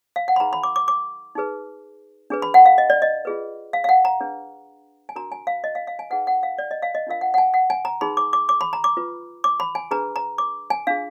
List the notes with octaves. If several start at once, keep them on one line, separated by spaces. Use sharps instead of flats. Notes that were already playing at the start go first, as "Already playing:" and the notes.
F5
F#5
B5
D#4 G#4 B4 A#5
B5
D6
D6
D6
D#4 G#4 B4
D4 G#4 B4
B5
F#5
F5
D#5
D5
D#5
F4 G#4 B4
F5
F5
F#5
A#5
D4 G#4 B4
G#5
D4 F#4 A#4 A#5
G#5
F5
D#5
F5
F5
G#5
D#4 G#4 B4 F#5
F#5
F5
D5
D#5
F5
D#5
D4 F4 A#4 F5
F#5
F#5
G#5
F#5
G#5
A#5
D#4 G#4 B4 B5
D6
D6
D6
B5
A#5
D6
F4 B4
D6
B5
G#5
D4 G#4 B4 A#5
A#5
D6
G#5
D4 F4 G#4 F5